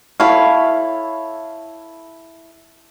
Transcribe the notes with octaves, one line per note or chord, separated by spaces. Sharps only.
E4 A4 C#5 F5